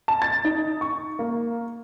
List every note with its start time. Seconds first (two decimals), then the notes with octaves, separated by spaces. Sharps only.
0.08 A5
0.22 A6
0.45 D#4
0.81 C#6
1.19 A#3